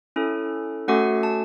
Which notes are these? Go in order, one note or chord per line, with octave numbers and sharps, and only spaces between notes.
C#4 E4 A4
A3 C#4 F#4 A4 F#5
A5